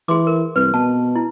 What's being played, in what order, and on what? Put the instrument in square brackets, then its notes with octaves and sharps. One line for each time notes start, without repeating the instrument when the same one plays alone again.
[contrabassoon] E3 [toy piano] G#4 C6 D6
[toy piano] A#4
[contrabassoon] C2 [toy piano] B4
[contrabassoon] B2 [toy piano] A5
[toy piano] E4